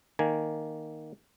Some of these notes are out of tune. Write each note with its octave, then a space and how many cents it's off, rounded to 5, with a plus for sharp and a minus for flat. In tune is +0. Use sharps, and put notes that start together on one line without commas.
D#3 -5 A#3 +0 G#5 +0